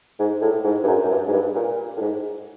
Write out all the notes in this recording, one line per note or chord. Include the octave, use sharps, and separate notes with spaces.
G#2
A2
G#2
G2
F#2
F#2
G2
G#2
G2
A#2
A2
G#2